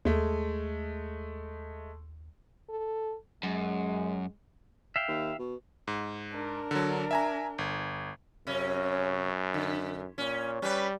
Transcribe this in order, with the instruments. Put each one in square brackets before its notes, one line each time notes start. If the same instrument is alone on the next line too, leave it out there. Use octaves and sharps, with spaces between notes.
[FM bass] D#2 [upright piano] G#3 A3
[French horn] A4
[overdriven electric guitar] F#2 [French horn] G#3
[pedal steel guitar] E5 F5 G5
[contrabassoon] D#2
B2
[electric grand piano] G#2
[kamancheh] D4 A#4
[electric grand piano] D3 F#3
E5 G#5 A#5
G1
[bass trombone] F#2 [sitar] C3 C#4
[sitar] D3
[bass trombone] A#2 [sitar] C#4
[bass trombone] G3 [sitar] C#4 B4